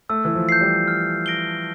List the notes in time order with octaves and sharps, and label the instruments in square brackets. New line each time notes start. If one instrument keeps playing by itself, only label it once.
[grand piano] A3 [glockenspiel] E6
[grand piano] E3
F3
[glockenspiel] G6 C7
[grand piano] G3
[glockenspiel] F6
A#6 D7 G7